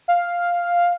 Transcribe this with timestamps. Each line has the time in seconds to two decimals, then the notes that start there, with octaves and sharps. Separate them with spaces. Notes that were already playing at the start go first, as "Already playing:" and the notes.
0.08 F5